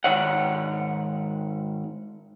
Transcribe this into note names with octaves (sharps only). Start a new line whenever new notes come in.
G#2 D#3 C#5 F#5